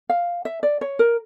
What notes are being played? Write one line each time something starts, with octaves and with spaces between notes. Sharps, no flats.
F5
E5
D5
C#5
A#4